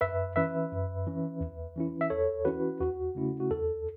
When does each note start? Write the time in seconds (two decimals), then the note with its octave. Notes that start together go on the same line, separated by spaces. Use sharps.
0.01 F#2 B4 E5
0.36 E3 C#4 B4 E5
0.72 F#2
1.07 E3 C#4
1.40 E2
1.76 E3 C#4 E4
2.01 E5
2.10 E2 A4 C#5
2.45 E3 C#4 E4 F#4 B4
2.81 E2 F#4
3.15 C#3 A3 C#4 E4
3.40 F#4
3.51 E2 A4